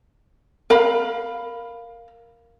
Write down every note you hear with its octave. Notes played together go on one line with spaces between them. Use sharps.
A#4 F5 B5